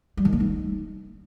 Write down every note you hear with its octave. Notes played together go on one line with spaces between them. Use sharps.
G3
D#3
A#3
D#4